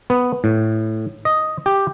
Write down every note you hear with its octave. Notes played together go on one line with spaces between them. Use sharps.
B3
A2
D#5
G4